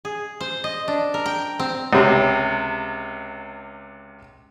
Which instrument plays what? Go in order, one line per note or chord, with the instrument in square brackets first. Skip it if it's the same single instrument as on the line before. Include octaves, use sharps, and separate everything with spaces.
[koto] G#4
C5
D#5
D4
A#4
G5
C4
[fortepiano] C#2 C3